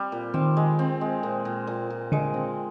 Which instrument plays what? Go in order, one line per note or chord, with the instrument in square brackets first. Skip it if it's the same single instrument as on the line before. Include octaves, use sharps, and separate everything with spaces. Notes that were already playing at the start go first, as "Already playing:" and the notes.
Already playing: [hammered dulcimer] G3 C4
A#2
[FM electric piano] D#3 [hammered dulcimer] C4
[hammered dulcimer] G#3
C4
G#3
A#2
A#2
A#2
A#2
[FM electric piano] D3 [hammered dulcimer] G#3
[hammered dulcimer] C4